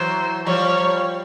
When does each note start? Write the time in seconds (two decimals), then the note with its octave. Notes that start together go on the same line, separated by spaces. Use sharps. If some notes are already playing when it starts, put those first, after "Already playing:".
Already playing: E3 F#3 C5
0.47 F3 G3 C#5